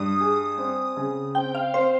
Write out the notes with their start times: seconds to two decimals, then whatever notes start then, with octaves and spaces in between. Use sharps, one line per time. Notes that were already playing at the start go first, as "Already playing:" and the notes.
Already playing: G2 D#6
0.20 G#4
0.58 C4
0.97 C#3
1.35 C4 G5
1.55 F5
1.74 C4 C5